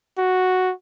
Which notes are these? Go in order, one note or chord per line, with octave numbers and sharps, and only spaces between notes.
F#4